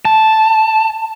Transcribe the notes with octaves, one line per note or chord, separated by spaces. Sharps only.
A5